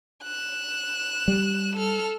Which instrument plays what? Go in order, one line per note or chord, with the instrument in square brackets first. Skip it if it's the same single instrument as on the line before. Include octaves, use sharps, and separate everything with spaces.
[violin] F#6 E7
[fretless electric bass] G3
[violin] A4 F6